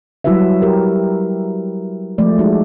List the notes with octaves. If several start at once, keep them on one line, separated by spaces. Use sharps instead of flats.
F#3 G3 E4 F#4 B4 E5
G4 A#4
F3 G#3 A3 D5
G#3 D#4 F#4